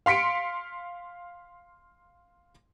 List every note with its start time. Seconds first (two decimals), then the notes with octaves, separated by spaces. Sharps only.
0.06 F5 C6 B6 C#7 D7